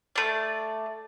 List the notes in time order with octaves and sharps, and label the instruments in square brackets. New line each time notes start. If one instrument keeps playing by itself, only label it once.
[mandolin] A3 D5